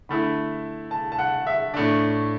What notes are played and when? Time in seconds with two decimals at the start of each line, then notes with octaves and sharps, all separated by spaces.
0.09 D3 A3 E4 B5
0.91 A5
1.12 A5
1.18 F#5
1.47 E5
1.74 A2 A3 D4